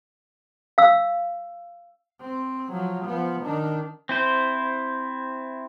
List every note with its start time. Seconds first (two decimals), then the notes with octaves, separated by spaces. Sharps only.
0.78 F5 E6
2.21 C4
2.72 F3 F#3
3.06 F3 B3
3.43 D#3 D4
4.09 C4 E4 C5